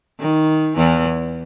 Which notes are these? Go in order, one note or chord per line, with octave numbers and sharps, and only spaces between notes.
D#3
E2 E3